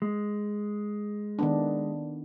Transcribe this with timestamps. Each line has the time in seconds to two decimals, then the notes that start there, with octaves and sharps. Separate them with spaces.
0.02 G#3
1.39 D#3 B3 D4